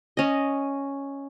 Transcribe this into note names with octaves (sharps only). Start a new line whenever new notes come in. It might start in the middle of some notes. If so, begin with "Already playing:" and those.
C#4 D#5